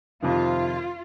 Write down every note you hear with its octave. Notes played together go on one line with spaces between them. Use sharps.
F2 C3 D#3 F4